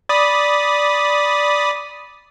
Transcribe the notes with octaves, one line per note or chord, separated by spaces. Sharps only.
D5 B5 D#6